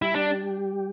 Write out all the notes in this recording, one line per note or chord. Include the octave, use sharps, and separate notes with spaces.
G3 E4 G4
D4